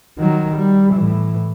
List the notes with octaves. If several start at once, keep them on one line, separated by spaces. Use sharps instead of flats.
D#3 F#3
G3
A2 E3